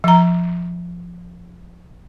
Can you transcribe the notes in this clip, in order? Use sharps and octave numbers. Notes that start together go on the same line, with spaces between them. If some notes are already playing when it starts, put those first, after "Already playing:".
F3 A#5